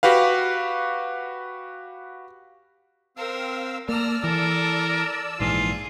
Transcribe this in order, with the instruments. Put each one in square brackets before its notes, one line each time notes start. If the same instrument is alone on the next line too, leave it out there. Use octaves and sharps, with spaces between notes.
[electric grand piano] F#4 G4 B4 F5
[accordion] C4 F5 E6 [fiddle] A#4
[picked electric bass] A#3 [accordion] D5 A5 E6 [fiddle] A#5 F6
[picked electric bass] E3 [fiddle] A4 [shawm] A#4
[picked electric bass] A#1 G#2 E3 [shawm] F4 [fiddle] G#4